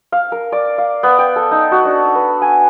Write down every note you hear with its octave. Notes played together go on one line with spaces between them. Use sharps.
F5
A#4
D5
F5
B3
G5
A4
D#4
F#4
D4
B4
G#5